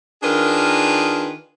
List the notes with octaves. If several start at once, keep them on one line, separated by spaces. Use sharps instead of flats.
D#3 D4 F4 G#4 A#4 B4